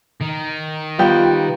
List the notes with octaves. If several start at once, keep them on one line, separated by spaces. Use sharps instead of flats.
D#3
G3 B3 F4 G4